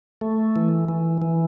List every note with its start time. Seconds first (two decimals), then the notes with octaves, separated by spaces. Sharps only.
0.21 A3
0.56 E3
0.88 E3
1.22 E3